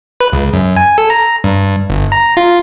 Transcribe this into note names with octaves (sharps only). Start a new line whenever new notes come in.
B4
C#2
F#2
G#5
A4
A#5
G2
G1
A#5
F4